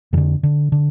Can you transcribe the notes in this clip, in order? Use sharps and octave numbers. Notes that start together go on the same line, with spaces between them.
F2 D3 E3
D3
D3